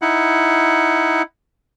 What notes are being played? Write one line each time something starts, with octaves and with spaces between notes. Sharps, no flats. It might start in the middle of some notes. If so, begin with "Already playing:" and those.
D#4 E4 F#5